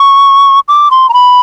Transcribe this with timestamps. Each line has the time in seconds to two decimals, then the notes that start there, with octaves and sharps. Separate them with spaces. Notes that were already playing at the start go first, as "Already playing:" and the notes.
Already playing: C#6
0.68 D6
0.91 C6
1.09 A#5
1.14 B5